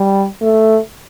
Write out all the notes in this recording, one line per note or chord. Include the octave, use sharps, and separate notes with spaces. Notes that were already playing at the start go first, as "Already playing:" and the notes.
Already playing: G3
A3